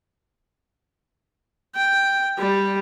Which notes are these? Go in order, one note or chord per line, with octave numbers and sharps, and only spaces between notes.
G5
G3